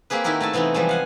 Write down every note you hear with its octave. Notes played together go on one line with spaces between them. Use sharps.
A#3 C4 G4 G#4 B4
D#3 D#4 E4 F#4 G4 A#4
A3 E4 G#5 A5
C3 E3 B3 C4 D#4
E3 F3 G3 G#3
F5 F#5 G#5